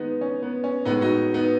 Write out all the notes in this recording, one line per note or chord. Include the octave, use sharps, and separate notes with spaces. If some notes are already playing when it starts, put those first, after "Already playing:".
Already playing: D#3 G#3 B3 D#4
C#4
B3
C#4
A2 G#3 B3 D#4
D#4 F#4
B3 D#4